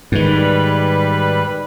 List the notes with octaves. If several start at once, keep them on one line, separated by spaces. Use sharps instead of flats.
G#2 D#3 G3 B4